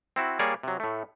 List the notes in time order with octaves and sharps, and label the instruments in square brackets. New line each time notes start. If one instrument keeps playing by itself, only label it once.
[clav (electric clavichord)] C4 E4 F#4
G3 A#3 G#4 C#5 D5
C3 F#3
A2 A3